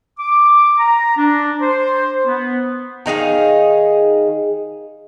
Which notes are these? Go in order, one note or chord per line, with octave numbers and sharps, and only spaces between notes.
D6
A#5
D4
C5
B3
D#3 D#4 G#4 F5